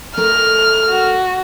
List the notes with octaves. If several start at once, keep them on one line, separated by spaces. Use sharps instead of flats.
A3 A#4 F6
F#4